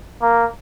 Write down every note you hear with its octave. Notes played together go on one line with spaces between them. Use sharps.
A#3